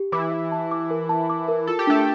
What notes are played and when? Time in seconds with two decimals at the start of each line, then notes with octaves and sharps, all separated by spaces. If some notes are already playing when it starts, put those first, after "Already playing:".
Already playing: G4
0.12 E3 E4 D6
0.32 E5
0.52 A5
0.71 D6
0.91 A#4
1.09 A5
1.30 D6
1.48 A#4
1.67 F4 A4
1.79 G4
1.87 A3 D4 A4